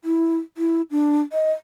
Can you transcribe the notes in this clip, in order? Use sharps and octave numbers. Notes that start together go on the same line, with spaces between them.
E4
E4
D4
D#5